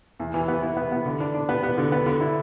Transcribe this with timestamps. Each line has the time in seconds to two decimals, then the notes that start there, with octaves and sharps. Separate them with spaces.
0.20 E2
0.34 E3
0.48 B3
0.63 E4
0.77 B3
0.92 B3
1.06 D3
1.20 D4
1.34 D4
1.49 B3
1.63 B3
1.78 D3
1.92 B3
2.06 D3
2.21 E4